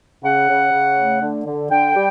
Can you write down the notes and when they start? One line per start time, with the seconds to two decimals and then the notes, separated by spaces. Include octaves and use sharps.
0.23 C#3 F#5
0.49 C#3
0.72 C#3
0.97 A3
1.22 D3
1.46 D3
1.71 D3 G5
1.95 G3